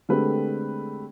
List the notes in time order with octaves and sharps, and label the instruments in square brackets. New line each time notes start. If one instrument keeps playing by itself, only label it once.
[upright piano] D3 G#3 A3 C4 G4 B4